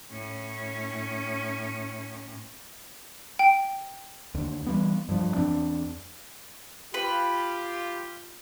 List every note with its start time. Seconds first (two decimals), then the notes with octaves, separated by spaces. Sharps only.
0.12 A2 C#4
3.39 G5
4.35 D#2 D3
4.66 E3 G3 B3
5.09 G2 F3
5.35 E2 C4 D4
6.94 F4 G4 B4